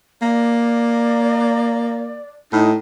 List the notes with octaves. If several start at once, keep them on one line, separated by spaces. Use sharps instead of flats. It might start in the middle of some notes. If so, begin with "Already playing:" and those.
A#3 D5
A2 D#4